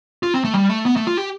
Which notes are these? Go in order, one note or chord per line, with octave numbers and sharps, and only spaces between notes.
F4
C4
A3
G3
A3
B3
A3
F4
G4